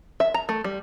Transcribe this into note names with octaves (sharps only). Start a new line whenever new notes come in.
E5
A#5
A3
G3